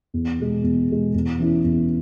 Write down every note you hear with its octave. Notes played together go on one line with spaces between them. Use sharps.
E2
B2 G#3
E2
B2 G#3
E2
E3 C#4 E4
E2